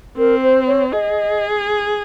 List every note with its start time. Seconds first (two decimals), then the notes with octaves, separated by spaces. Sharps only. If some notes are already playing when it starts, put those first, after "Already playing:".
0.17 C4 A#4
0.42 C5
0.66 C#5
0.92 G#4 D#5